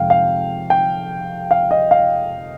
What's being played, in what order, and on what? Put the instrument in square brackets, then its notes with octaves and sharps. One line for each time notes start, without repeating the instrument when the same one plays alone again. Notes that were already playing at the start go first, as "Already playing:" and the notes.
Already playing: [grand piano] F2 C3 G#3 F5 G5
F5
G5
F5
D#5
F5